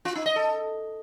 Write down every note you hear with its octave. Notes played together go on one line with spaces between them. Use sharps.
F4
D#4
D#5
A4